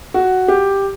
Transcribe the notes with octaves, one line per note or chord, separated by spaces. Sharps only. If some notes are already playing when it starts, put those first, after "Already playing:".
F#4
G4